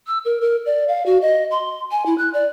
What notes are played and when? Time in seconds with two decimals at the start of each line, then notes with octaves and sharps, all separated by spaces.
0.07 E6
0.25 A#4
0.41 A#4
0.66 D5
0.88 F5
1.06 F#4
1.22 D#5
1.51 C6
1.91 G#5
2.06 E4
2.18 F#6
2.34 D5